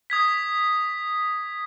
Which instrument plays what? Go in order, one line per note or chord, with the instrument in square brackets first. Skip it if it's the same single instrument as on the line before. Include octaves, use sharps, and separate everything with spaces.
[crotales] D#6 G#6 B6